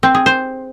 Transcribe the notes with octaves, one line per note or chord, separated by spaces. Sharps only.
C4
G#4
C5